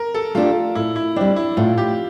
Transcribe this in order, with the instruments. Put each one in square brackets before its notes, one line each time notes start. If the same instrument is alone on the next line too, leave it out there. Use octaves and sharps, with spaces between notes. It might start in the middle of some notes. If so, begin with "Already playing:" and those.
Already playing: [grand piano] A#4
A4
[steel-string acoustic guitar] A3 D4 G4 [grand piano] F4
[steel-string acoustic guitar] A2 [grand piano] E4
[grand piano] E4
[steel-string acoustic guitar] G3 C4 [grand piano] D4
[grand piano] E4
[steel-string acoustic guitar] A2 [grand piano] F4
[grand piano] G4